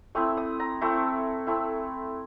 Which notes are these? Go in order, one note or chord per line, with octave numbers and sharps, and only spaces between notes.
A3 C4 E4 D#6
D#6
A#5
A3 C4 E4
A3 C4 E4